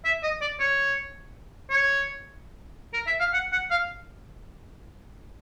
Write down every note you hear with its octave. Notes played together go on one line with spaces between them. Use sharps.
E5
D#5
D5
C#5
C#5
A#4
E5
F5
F#5
F#5
F5